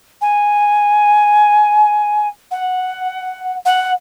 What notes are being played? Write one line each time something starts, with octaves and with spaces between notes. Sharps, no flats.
G#5
F#5
F#5